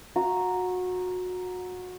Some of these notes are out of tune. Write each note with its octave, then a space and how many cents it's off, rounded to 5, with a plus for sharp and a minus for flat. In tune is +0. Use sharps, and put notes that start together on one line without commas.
F#4 -25 A#5 +0